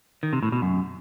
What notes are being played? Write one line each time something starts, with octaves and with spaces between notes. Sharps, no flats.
D#3
C3
A2
B2
F#2